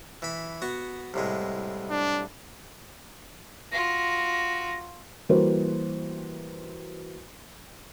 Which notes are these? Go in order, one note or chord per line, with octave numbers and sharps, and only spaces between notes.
E3 B5
B3 F#4
C2 A2 G#3
D4
F4 F#4 A#6
E3 G3 A#3 F#4 B4 C5